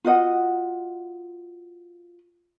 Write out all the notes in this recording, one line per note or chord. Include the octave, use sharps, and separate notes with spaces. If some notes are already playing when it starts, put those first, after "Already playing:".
F4 F#4 D#5 F#5